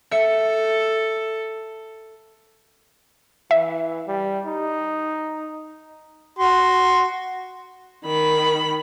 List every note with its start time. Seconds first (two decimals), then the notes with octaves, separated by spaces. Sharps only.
0.11 A4 E5 C#7
3.51 E3 E5
4.07 G3
4.46 D#4
6.39 F#4 C6
8.05 D#3 B5